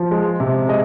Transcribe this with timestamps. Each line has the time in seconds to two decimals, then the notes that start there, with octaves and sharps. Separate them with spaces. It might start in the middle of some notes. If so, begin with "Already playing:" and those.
Already playing: F3
0.11 G#3
0.40 C3
0.69 G#3 D#5